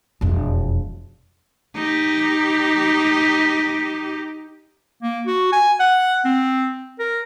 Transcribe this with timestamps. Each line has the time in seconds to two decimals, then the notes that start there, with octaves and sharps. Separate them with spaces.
0.21 E1 F2
1.76 D#4 G4
5.03 A#3
5.26 F#4
5.52 G#5
5.80 F#5
6.25 C4
6.99 A#4